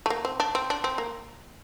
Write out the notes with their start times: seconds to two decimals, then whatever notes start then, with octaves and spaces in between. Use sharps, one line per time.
0.06 A3
0.10 A#3
0.25 C4
0.40 D4
0.55 C4
0.70 D4
0.84 C4
0.98 A#3